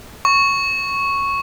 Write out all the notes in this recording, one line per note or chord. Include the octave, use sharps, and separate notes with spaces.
C#6